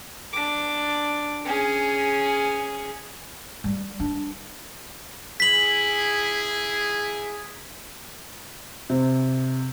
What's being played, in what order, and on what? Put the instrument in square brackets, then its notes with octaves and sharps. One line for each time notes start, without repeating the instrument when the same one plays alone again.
[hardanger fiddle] D4 D6
C#4 G#4
[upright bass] G3
D4
[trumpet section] E4 G#4 [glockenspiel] B6 F#7
[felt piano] C3